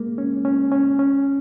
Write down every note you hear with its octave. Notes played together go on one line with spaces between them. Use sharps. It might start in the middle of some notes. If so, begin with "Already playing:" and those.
Already playing: G#3 A#3
C#4
C#4
C#4
C#4